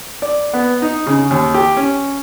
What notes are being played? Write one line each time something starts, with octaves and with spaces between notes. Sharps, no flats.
D5
B3
D#4
C#3
D#2
G4
C#4